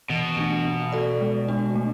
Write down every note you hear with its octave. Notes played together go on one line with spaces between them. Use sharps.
B2 E3
A3 D4
B3
F#4 A4 D5
G#3
D4 F#4
A3